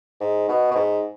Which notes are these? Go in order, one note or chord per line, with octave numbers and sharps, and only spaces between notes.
G#2
B2
B2
G#2